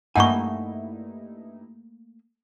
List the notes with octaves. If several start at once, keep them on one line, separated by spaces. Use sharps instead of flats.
G2 A3 A#3 D#4 E4 F#5 G#5 C#6